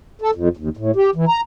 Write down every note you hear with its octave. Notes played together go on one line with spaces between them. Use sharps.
A4
F2
D#2
A2
G4
E3
A#5